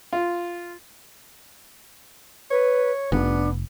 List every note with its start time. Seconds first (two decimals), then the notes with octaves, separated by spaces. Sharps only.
0.13 F4
2.51 B4 C#5
3.12 F1 B3 D4